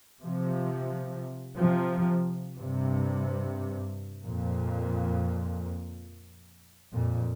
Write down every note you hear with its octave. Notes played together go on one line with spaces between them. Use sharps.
C3 F3
C3 F3
G2 C3
F2 A#2
F2 A#2